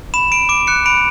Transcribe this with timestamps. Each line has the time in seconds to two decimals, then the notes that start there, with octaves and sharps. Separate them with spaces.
0.14 B5 E7
0.31 B5 D7
0.49 D6 D7
0.67 F#6 C#7
0.86 B5 D7